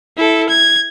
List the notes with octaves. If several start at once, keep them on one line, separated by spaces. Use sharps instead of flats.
E4 A4
G#6